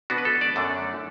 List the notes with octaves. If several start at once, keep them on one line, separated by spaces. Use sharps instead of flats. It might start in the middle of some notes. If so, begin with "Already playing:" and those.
B2 B3 D4 F#4
B4
A4
D5
F#2 D3 A3 D4